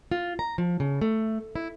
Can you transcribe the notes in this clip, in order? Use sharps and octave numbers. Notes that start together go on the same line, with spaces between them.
F4
A#5
F3
C#3
A3
E4